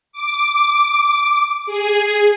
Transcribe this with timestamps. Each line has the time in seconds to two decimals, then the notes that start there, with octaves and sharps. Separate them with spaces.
0.12 D6
1.66 G#4